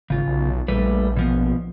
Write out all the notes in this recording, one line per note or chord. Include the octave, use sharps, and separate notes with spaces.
G#1 C#3 F4
B1
A#1 G3 A3 B4
B2 F3 B3